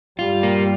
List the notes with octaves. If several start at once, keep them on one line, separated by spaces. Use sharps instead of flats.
G2 G3 F4
A#3